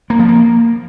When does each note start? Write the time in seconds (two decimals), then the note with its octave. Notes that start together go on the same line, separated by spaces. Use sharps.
0.10 A#3
0.19 F3
0.29 A#3